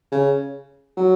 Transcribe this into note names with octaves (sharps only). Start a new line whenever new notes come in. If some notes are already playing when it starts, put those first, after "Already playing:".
C#3
F#3